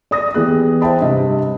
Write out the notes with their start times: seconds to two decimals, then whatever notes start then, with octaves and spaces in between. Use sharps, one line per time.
0.11 D5 D#6 A#6
0.34 E3 B3 G4 G#4 F#6
0.81 C5 E5 G5 A5 B5
1.01 G2 C3 D#5